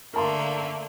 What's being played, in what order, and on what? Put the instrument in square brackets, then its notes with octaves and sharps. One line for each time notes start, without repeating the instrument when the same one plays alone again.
[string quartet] D3 A3 A#3 [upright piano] A#4 A5 C6